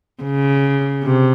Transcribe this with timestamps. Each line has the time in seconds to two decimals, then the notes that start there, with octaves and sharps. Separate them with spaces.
0.23 C#3
1.03 C3